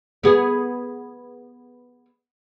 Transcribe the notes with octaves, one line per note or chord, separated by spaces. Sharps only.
B3 G#4